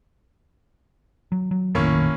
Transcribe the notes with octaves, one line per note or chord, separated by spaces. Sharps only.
F#3
F#3
F1 A#1 A2 D#3 A#3 C#4